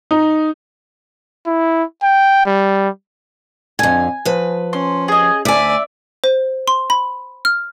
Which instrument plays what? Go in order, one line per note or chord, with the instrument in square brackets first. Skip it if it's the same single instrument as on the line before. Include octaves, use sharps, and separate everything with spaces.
[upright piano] D#4
[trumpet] E4
G5
G3
[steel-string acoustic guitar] F2 D3 [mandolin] G#5
[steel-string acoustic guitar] F3 B4
[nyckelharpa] C#4 [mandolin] C6
[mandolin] G#4 D#5
[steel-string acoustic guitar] D2 G#5 [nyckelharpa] D5 [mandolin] E5
[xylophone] C5
C6
B5
F6